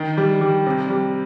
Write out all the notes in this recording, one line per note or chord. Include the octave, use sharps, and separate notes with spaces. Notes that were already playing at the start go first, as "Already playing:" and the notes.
Already playing: D#3 G5
G3
G3
C3
G3